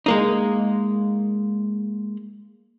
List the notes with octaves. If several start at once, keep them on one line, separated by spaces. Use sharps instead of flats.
G#3 A#3 D#4